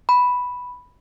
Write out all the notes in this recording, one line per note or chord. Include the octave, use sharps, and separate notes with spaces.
B5